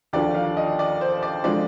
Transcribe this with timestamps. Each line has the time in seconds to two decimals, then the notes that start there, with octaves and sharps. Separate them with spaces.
0.13 D#2 D3 F3 D5
0.35 F5
0.57 D#5
0.79 D5
1.01 C5
1.23 D5
1.44 D3 F3 G#3 D5